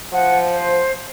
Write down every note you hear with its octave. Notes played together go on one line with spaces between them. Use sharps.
F3 F#5
C5